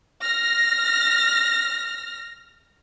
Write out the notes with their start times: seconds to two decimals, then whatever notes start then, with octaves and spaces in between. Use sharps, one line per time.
0.22 F6 A#6